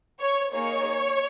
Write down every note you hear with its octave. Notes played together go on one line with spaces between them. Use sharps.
C#5
A#3 D#4 G#4 C#5